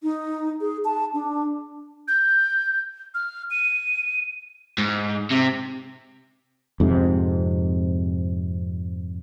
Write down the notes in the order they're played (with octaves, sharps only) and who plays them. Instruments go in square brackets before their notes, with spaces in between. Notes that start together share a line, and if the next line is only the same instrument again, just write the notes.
[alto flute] D#4
G#4
A5
D4
[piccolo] G6
F6
D#7
[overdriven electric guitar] G#2
C3
[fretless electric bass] F2 G#2 C3